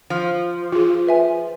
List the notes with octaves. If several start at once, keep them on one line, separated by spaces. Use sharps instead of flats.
F3
F4 G#4
B4 E5 G#5